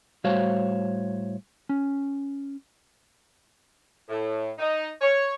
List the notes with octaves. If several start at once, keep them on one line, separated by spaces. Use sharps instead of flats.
A2 G3 F#4 C5 C#5 F5
C#4
A2
D#4
C#5